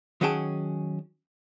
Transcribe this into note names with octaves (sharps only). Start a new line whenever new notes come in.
D#3 F#3 C#4 G#4 G5 A5